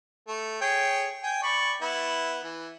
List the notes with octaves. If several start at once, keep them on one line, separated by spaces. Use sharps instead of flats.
A3
G#4 C#5 G5
G5 G#5
D5 B5 C#6
B3 E4
E3